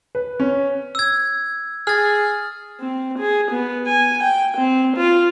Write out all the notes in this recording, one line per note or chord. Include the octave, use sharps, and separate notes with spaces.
B4
C#4
E6 G#6
G#4 F6 A6
C4
G#4
B3
G#5
G5
C4
F4